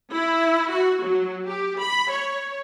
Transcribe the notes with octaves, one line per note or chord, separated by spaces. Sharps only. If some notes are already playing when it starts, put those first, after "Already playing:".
E4
F#4
F#3
G4
B5
C#5